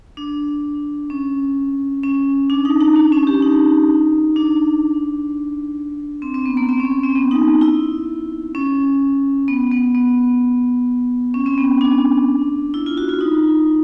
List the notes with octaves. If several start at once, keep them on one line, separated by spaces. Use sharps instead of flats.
D4
C#4
C#4
D4
D#4
D#4
D4
C#4
G4
D#4
D4
C4
C4
B3
A#3
C4
C#4
C4
B3
D#4
E4
C#4
B3
B3
B3
C#4
C4
B3
D4
E4
F4
F#4
F4
D#4